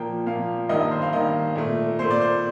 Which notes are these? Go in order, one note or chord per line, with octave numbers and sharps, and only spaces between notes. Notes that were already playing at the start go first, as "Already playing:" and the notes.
Already playing: A#2 F3 A#3 G5
A#2 F3 A#3 F5
G2 D#3 A#3 D#5
D#5
C5
F5
G2 D#3 A#3 D#5
A#2 A3
A#2 A3 C5
D5
C5